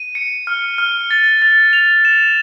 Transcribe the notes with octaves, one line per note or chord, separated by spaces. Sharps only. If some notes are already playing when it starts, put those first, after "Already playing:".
Already playing: D#7
C#7
F6
F6
A6
A6
F7
E7